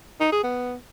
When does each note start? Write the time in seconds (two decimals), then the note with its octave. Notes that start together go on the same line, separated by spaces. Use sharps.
0.20 D#4
0.32 G#4
0.44 B3